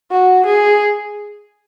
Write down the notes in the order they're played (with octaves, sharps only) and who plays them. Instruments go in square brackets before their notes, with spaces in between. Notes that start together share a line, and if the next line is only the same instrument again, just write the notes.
[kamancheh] F#4
G#4